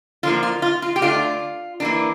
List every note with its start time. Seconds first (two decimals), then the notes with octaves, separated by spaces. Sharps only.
0.23 D3 F3 A#3 F4
0.43 F4
0.62 F4
0.82 F4
0.96 G4
1.01 D3 A3 D4 F4
1.80 E3 A#3 D4